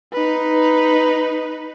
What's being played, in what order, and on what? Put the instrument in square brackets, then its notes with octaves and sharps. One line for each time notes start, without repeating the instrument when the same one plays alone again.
[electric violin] D#4 B4